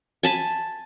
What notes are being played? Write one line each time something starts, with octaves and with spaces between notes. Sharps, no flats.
G#5 A5 B5